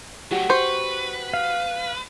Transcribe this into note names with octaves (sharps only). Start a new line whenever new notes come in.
F#3 A3 F#4 G4 F#5
B4 C5 C#6
F5